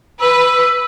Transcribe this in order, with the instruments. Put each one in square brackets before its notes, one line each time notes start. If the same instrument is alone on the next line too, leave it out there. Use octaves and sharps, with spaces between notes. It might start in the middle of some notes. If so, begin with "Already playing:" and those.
[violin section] B4 [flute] E6